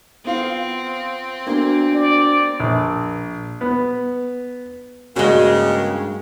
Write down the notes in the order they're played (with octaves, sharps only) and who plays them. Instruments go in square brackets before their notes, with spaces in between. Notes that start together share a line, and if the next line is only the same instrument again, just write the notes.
[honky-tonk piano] B3 F4 F5 [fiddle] C4
[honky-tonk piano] A#3 A#4 [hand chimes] B3 D4 F#4
[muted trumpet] D5
[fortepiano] A#1
B3
[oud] G2 G#3 [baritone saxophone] C#3 [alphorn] A#3 [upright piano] F#4 G7